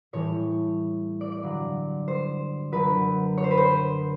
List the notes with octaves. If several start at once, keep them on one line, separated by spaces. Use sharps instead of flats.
A2 E3 G3 C#5
D5
D5
G2 D3 F#3
C5
F#2 D3 F#3 B4
C#5
C5
B4
C5